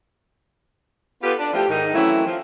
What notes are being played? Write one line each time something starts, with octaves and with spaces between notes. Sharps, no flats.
B3 F4 G4 A4 B4
D4
F3 A3 E4 G4
G#2 D#3 D#4
E3 F#3 A3 C4 C#4 E4
F3